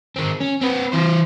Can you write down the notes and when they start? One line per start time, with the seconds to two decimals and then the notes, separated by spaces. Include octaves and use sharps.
0.16 D#3 C4
0.40 C#4
0.61 C4 B4
0.92 E3 C5